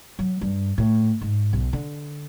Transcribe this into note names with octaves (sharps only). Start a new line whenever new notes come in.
F#3
G2
A2
G#2
B1
D3